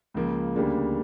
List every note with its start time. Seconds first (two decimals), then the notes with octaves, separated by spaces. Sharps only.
0.14 C#2 C#3 F3 A#3
0.55 D2 C#3 G3 A#3 D4